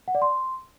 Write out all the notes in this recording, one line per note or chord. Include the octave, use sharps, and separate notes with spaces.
F#5
D5
C6